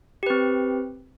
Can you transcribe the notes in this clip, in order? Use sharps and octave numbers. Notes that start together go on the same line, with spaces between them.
C4 G4 B4